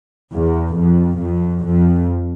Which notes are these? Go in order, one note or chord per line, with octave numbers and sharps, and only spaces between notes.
E2
F2
F2
F2